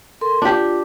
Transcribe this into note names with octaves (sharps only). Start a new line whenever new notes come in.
A4 A#4 C6
D4 F4 G4